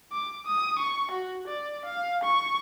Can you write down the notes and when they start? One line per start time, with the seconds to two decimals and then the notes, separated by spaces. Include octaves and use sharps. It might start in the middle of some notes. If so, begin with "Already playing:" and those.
0.12 D6
0.46 D#6
0.79 C#6
1.12 F#4
1.47 D5
1.85 F5
2.23 C#6